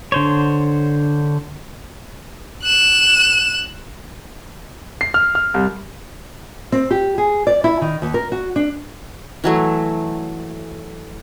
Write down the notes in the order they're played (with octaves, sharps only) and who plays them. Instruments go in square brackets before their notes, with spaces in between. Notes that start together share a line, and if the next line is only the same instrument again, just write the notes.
[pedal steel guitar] D3 C5 C#5
[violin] F#6 E7
[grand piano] C7
F6
F6
C2
[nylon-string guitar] C4
G4
G#4
D5
E4
D#3
D#2
A#4
F#4
D4
[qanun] E3 F#3 A3